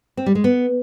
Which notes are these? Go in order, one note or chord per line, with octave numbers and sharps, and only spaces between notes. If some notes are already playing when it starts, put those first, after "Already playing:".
C4
G3
G#3
B3